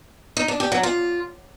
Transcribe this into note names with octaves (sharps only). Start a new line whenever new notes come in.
D#4
D4
G4
F#3
F4